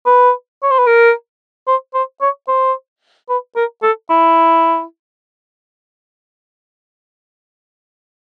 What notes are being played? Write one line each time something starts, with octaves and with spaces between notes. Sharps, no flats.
B4
C#5
C5
B4
A#4
C5
C5
C#5
C5
B4
A#4
A4
E4